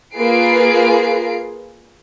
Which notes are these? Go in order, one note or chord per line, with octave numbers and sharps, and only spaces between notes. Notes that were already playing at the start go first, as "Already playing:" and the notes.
A#3 F4 G#4 B4 C7 D7